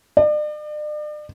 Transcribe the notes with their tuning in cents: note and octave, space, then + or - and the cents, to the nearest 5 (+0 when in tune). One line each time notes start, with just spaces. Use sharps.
D5 +40